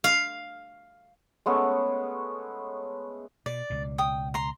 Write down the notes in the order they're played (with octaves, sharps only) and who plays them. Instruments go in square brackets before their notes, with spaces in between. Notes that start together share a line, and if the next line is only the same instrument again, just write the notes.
[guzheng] F5
[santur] G#3 A3 B3 C#4
[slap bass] B2 [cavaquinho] D5
[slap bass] C#2 B2
[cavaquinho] G5 D#6
A#5 C6